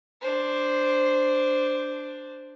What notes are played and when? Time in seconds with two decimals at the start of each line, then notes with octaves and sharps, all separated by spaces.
0.21 D4 C5